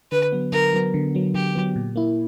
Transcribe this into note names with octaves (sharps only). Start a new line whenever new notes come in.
D3 B4
F#3 B3
D3 A#4
F#3 B3
D3
F#3 B3
D3 G4
F#3 B3
A#2
A#3 E4